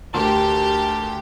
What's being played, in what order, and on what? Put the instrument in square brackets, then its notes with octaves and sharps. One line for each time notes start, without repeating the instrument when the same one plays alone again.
[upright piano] D2 [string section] G4 [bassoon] A#4 [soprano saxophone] A5